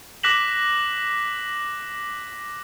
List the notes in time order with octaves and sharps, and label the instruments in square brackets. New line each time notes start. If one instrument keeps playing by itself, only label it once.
[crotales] D6 F#6 A#6 B6 E7 F#7